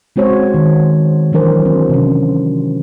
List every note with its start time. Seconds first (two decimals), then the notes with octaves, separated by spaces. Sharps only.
0.16 G#3 C4 F#4 C5 C#5
0.54 D#3
1.32 E3 F#3 D4 A#4 C5
1.65 C4
1.89 C3 C#4